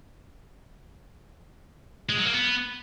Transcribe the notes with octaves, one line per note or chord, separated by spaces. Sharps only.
G#3
F#3
A#3
B3